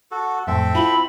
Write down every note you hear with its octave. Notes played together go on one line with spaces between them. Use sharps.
F#4 A4
F2 A2 C4 A4 E5
E4 F4 B5